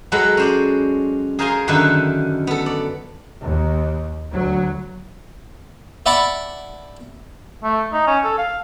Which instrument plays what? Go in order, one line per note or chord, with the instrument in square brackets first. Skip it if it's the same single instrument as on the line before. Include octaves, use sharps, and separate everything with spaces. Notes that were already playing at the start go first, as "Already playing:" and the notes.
[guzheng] F#3 G#3 A4 B4 F#5
C#4 C5 D5
G#4 A#4 C5 F5 G#5 C6
F#2 D3 D#3 A4 B4 E5
B3 A4
D5
[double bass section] D#2
D2 F#3
[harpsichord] D5 E5 F#5 A5 B5 D6
[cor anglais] A3
D#4
C#4
A4
F5